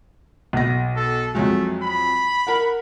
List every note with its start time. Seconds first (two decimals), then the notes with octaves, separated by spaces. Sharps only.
0.53 B1 A#6
0.96 A4
1.35 F2 F#3 G#3 A3
1.83 B5
2.47 A#4 F#5